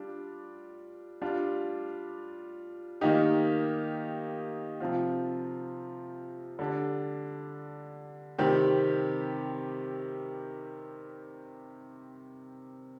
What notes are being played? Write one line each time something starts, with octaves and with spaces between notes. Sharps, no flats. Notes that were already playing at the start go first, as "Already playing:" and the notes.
Already playing: G3 D4 F4
G3 D4 F4
D#3 A#3 D#4 G4
C3 F3 C4 F4
D3 G3 D4
C3 D#3 G3 C4 G4